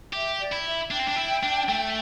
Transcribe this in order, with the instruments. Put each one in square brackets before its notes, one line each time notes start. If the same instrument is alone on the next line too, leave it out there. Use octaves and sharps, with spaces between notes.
[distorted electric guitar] G4 [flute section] E5
[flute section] D5
[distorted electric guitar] E4
[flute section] E5
[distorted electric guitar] D4 [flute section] G5
[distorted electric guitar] C4
D4
E4
D4
A3